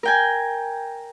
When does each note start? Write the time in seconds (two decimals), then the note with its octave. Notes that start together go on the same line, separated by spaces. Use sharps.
0.03 A#4 G5 G#5